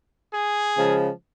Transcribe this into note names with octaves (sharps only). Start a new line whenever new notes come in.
G#4
C#3 F3 G#3